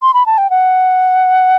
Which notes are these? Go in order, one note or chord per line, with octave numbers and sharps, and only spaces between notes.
C6
B5
A5
G5
F#5